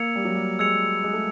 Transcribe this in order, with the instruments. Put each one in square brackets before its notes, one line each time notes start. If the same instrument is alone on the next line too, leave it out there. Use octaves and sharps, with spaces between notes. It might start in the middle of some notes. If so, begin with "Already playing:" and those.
Already playing: [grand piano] A#3 [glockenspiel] E6 G#6 C#7 F7
[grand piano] G3
F#3
G3
[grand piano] G#3 [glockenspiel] E6 G#6 C#7 F7
[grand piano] G#3
A3